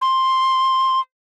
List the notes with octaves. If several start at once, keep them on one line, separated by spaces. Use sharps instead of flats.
C6